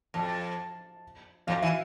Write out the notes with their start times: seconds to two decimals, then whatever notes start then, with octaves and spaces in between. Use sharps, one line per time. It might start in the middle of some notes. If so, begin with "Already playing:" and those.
0.14 F2 A5
1.47 F2 F5
1.62 E3 E5